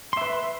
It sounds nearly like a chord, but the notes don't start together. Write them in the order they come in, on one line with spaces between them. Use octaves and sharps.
C6 E5 B4